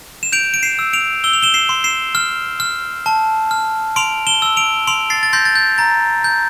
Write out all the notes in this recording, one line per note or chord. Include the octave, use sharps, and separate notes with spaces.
E7
G6 D7 F7
D7
C7 E7
E6
D7 F7
E6 G7
F7
E7 G7
C7 E7
C6
C7 E7
F6
F6
A5
F6
C6 D7 F7
E7 G7
E6
D7 F7
C6 D7 F7
A6 C7
A6
C6 G6 A#6
A6
G6
A#5 A6
G6